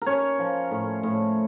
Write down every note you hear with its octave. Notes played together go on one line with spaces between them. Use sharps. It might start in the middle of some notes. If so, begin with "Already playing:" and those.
C#4 A#4 C#5
F3
A2
A2